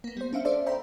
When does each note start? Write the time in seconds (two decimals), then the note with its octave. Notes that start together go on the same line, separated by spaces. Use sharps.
0.04 A#3 B3
0.17 G3 C5
0.33 C#4 D4 E5 F5
0.45 D4 A4 C5 D5 E5
0.66 C5 E5 G5 A#5 B5